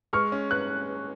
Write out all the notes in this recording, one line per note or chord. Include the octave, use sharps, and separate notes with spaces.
G#3 C#6 F6
C#4
F#6